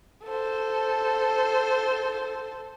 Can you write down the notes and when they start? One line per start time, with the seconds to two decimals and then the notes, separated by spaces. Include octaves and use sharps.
0.24 A4 C5